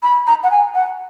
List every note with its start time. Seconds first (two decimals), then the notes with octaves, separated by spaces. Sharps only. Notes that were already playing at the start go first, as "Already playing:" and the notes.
0.03 B5
0.27 A#5
0.43 F#5
0.51 G#5
0.74 F#5